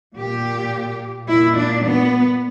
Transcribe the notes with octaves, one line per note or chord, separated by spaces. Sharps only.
A#2 G4
A#2 E4
D4
B3